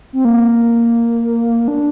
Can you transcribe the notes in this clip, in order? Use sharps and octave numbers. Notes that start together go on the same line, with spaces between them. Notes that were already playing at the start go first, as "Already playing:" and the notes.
C4
A#3
D4